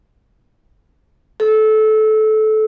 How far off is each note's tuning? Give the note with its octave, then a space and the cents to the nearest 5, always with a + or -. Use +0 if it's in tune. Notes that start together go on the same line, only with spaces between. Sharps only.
A4 -20